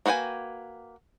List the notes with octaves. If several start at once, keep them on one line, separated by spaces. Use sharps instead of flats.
A#3 F#4 B4 G5 G#5